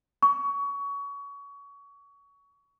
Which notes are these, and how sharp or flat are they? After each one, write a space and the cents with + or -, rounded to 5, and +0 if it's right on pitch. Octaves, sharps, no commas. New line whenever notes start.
C#6 +25